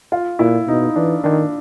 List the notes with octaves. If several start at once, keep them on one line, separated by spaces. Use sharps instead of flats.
F4
A#2 E4
B2 D#4
E3 D4
D#3 D4